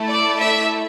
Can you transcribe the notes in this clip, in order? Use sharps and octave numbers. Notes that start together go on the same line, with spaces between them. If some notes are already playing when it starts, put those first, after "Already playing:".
Already playing: A3 E4 A4
D5
E5